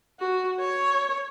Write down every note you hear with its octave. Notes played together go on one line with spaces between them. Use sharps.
F#4
C#5